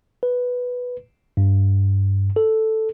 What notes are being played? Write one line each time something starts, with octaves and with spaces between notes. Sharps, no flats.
B4
G2
A4